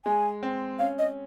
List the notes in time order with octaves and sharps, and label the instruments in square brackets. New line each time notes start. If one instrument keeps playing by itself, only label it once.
[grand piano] G#3 [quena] G#5
[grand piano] C4
[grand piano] C#4 [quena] F5
[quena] D#5